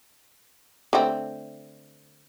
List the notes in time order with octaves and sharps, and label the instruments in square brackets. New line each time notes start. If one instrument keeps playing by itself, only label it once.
[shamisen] D3 A3 C4